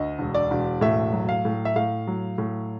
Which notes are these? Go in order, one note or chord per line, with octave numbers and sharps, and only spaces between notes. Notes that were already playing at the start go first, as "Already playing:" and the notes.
Already playing: D2 D#5
E1
D5
E1
A2 E5
F#3
F5
A2
E5
A2 F5
F#3
A2